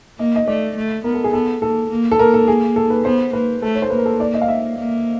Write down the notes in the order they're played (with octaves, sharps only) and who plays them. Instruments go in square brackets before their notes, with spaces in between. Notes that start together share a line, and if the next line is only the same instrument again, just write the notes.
[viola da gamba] A#3 [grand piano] D#5
[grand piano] D#5
[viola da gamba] A3 [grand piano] D5
[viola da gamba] A3
[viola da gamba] B3 [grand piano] A#4
[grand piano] A4
G#4
[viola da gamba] B3 [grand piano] A4
[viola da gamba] A#3 [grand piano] A4
[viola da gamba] A#3
[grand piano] A4
[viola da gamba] A#3 [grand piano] A#4
[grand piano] A4
G#4
A4
B4
[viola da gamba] B3 [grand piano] C5
[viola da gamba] A#3 [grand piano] B4
[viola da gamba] A3 [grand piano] A4
[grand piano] C#5
C5
[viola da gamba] A#3 [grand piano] B4
[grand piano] A#4
A4
D5
D#5
F5
E5
[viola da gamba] A#3